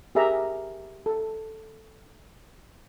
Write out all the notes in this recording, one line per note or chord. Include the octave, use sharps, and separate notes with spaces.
G4 G#4 A#4 E5 A#5
A4